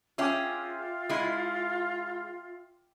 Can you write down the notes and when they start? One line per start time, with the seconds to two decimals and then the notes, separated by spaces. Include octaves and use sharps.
0.18 C#4 F4 G#4 E5 G5 D6
1.09 G#3 E4